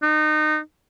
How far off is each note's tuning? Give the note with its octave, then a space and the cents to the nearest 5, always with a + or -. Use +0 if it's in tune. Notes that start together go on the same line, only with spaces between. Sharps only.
D#4 -25